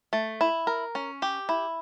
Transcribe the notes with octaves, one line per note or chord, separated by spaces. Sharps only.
A3
E4
A#4
C#4
G4
E4